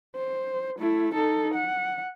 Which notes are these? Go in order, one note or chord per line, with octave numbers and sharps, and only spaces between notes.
C5
A3 E4
D#4 A4
F#5